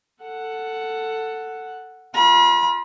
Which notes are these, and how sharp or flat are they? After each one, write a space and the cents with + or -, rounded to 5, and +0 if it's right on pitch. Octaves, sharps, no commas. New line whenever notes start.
A4 +15 F#5 +0
F4 +0 B5 -40